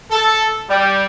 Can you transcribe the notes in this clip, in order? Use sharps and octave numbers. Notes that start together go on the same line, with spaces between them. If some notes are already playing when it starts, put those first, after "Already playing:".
A4
G3